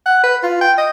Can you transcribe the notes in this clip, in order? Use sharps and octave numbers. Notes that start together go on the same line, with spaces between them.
F#5
B4
F4
G5
D#5